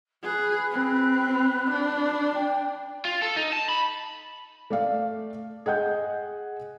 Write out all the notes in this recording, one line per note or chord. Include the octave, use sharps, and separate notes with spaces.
G#4 B4 F#6
C4
D4
G5
F4
A4
D#4
A5
B5
A3 D5 F5
G#4 D#5 F#5 G6